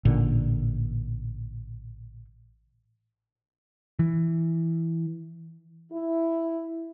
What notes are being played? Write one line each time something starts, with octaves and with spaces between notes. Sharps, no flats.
A1 A#2 D3
E3
E4